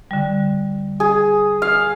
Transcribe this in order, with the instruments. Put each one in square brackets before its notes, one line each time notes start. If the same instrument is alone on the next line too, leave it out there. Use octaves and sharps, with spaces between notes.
[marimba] D3 G3
[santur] G#4
F5